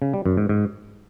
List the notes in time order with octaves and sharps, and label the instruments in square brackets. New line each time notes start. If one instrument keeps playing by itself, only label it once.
[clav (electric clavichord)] C#3
G3
F#2
G#2
G#2